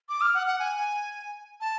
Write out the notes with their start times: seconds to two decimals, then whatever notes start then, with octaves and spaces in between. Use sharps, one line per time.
0.09 D6
0.21 F6
0.34 F#5
0.47 F#5
0.59 G#5
1.61 A5